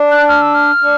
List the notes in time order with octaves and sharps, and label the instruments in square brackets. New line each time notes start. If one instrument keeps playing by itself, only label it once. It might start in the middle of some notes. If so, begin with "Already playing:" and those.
Already playing: [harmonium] D4
[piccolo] F#6
F6
E6
F6
[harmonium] D4